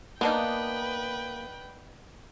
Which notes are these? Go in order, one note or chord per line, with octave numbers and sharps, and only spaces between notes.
A#3 B3 D4 D#4 B4 G5